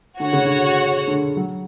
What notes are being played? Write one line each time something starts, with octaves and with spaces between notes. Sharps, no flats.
D3 F#4 C#5 F#5
C#3
D3
D3
F#3